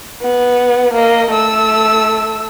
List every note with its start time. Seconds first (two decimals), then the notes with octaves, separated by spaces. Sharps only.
0.22 B3
0.94 A#3 D#5
1.31 A3 E6